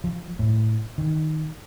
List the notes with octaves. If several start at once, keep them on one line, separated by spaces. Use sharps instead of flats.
F3
A2
D#3